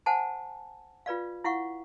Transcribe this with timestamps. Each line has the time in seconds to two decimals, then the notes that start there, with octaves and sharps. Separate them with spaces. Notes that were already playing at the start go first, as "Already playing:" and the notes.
0.06 C5 F#5 G#5 A5
1.06 F4 B4 D5 F5
1.44 E4 F5 F#5 C#6